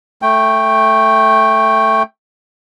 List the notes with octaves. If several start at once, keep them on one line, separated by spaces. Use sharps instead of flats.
A3 G5